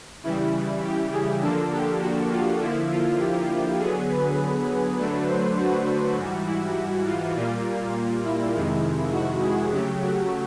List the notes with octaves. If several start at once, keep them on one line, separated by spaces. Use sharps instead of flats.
C#3 E3 G3 E4
G4
G#4
D3 F3 A#3 D4 A4
G4
F#4
F4
D3 F3 A#3 E4
F4
G4
D3 F#3 B3 G#4
B4
D3 F#3 A3 D4
C5
F#4
G#2 E3 G3
E4
F4
A#2 G3 A#3 F4
E4
F2 C3 D#3 G#3
F#4
G#4
C#3 F#3 A3 G4
F#4